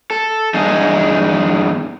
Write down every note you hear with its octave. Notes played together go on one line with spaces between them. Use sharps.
A4
E2 G2 D#4 G#4